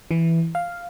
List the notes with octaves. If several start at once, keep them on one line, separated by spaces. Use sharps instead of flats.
E3
F5